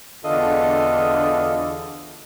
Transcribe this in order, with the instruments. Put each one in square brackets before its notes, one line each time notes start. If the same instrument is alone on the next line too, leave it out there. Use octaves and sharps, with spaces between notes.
[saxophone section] E2 D3 D4 F4 A4 D#5